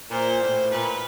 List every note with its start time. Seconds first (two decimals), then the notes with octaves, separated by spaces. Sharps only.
0.11 A#2 C5
0.42 A2
0.71 A#2 B4